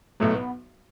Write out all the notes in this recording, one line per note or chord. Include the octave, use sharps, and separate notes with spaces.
B1 A2 F#3 A3
B3